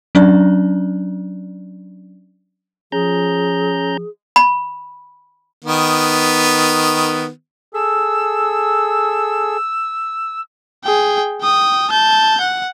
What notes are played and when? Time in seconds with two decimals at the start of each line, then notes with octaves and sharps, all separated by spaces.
0.15 F#3 C#4 D4 D5
2.92 F3 C#4 G#4 A#5 G6
4.36 B5
5.64 D#3 B3
7.74 G#4 A4 E6
10.84 G#4 G5
11.42 G5 D#6
11.90 A5 G6
12.40 F#5